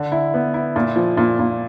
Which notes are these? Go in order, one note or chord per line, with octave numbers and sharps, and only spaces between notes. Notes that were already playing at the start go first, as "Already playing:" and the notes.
Already playing: D3
E4
B3
E4
A#2
F3
A#2
A#2